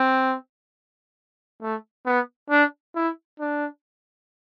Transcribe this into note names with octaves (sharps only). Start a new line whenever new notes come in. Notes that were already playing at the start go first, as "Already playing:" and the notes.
Already playing: C4
A3
B3
D4
E4
D4